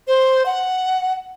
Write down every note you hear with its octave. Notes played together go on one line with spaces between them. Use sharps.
C5
F#5